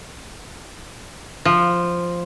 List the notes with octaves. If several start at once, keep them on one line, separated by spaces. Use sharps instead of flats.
F3